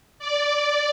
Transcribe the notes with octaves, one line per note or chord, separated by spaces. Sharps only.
D5